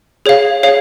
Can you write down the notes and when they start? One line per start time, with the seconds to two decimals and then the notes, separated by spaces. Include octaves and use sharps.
0.26 G#4 C#5 F5
0.63 G#4 C#5 F5